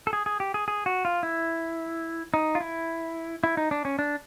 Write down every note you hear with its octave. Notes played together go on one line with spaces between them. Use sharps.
A4
G#4
G#4
G4
G#4
G#4
F#4
F4
E4
D#4
F4
E4
E4
D#4
D4
C#4
D4